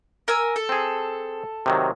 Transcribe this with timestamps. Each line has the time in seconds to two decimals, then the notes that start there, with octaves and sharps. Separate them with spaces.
0.28 A#4 G#5 E6
0.56 A4
0.69 C4 G#4
1.66 C3 D#3 F#3